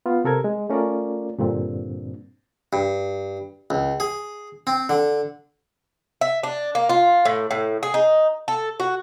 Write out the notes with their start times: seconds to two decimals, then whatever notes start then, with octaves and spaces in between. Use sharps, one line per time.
0.06 B3 F4
0.24 C3 A4 A#4 G#6
0.44 G#3
0.70 A3 C#4 F4 A#4 D5
1.38 G2 A#2 D3 C4
2.73 G2
3.70 C#2
4.00 G#4
4.67 C4
4.89 D3
6.21 E5
6.43 D4
6.75 A#3
6.89 F4
7.25 A2
7.51 A2
7.83 G#4
7.94 D#4
8.48 A4
8.80 F#4